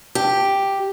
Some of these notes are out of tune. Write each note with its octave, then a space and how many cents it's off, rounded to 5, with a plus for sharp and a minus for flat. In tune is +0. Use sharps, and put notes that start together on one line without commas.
G4 +0